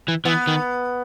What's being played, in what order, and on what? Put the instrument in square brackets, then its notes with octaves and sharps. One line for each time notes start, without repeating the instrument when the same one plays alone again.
[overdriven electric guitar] E3
[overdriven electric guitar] E3 [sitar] B3
[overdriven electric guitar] D#3